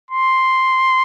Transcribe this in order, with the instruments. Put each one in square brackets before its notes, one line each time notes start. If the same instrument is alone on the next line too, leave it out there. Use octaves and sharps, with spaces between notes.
[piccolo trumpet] C6